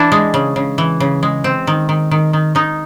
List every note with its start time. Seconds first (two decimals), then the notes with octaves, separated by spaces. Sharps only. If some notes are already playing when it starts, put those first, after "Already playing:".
Already playing: E3 D4 E4
0.12 G#3
0.34 C#3
0.56 C#3
0.78 E3
1.00 C#3
1.23 G#3
1.44 C4
1.67 D#3
1.89 D#3
2.11 D#3
2.33 D#3
2.55 D#3 D#4